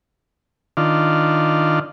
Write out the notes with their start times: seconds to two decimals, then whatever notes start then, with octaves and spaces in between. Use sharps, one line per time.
0.77 D#3 D4 F4